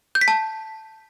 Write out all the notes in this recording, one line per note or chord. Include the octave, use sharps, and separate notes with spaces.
G6
B6
A5